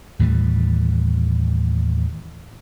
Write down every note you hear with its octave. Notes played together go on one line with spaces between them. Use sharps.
D#2 A2 E3 G3